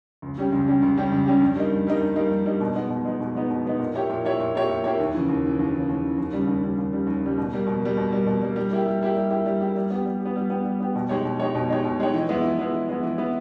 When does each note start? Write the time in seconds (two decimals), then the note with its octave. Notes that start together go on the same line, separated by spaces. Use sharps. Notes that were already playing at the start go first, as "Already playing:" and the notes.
0.22 C#2
0.38 C#3 G3 C#4 G4
0.52 C#2
0.67 C#3 G3 C#4 G4
0.82 C#2
0.97 C#3 G3 C#4 G4
1.12 C#2
1.26 C#3 G3 C#4 G4
1.41 G2
1.56 G3 A#3 D#4
1.72 G2
1.87 G3 A#3 D#4
2.01 G2
2.16 G3 A#3 D#4
2.30 G2
2.46 G3 A#3 D#4
2.60 B2
2.75 G#3 B3 D#4
2.90 B2
3.05 G#3 B3 D#4
3.20 B2
3.35 G#3 B3 D#4
3.50 B2
3.66 G#3 B3 D#4
3.79 A#2
3.95 A#3 E4 G4 C#5
4.10 A#2
4.25 A#3 E4 G4 C#5
4.40 A#2
4.55 A#3 E4 G4 C#5
4.69 A#2
4.84 A#3 E4 G4 C#5
5.00 D#2
5.15 C#3 E3
5.29 D#2
5.44 C#3 E3
5.59 D#2
5.74 C#3 E3
5.89 D#2
6.04 C#3 E3
6.18 D#2
6.33 C#3 G3
6.48 D#2
6.63 C#3 G3
6.78 D#2
6.93 C#3 G3
7.07 D#2
7.23 C#3 G3
7.38 B2
7.53 G3 A#3
7.67 B2
7.82 G3 A#3
7.97 B2
8.12 G3 A#3
8.27 B2
8.42 G3 A#3
8.56 G3
8.71 A#3 E4 G4
8.86 G3
9.02 A#3 E4 G4
9.16 G3
9.31 A#3 E4 G4
9.46 G3
9.61 A#3 E4 G4
9.76 G3
9.90 B3 G4
10.05 G3
10.21 B3 G4
10.36 G3
10.50 B3 G4
10.65 G3
10.81 B3 G4
10.95 B2
11.09 G#3 D#4 G4 C#5
11.25 B2
11.40 G#3 D#4 G4 C#5
11.55 B2
11.69 G#3 D#4 G4 C#5
11.84 B2
12.00 G#3 D#4 G4 C#5
12.14 E3
12.29 G#3 B3 E4
12.43 E3
12.59 G#3 B3 E4
12.73 E3
12.89 G#3 B3 E4
13.03 E3
13.18 G#3 B3 E4